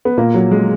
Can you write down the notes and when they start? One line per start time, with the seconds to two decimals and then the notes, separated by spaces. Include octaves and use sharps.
0.05 B3
0.18 A#2 A#3
0.34 F#3
0.51 G#3